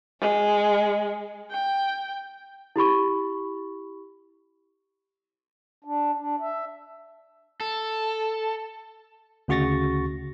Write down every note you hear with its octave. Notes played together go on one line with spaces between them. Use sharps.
G#3
G5
E4 G4 B5 C#6
D4
D4
E5
A4
D2 C#3 F#4 C#6 A6 A#6